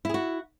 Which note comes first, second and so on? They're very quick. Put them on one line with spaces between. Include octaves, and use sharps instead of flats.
E4 G#4 F#4